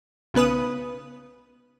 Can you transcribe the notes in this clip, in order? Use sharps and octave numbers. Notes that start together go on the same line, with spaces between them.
B1 C#3 B3 B4 D#6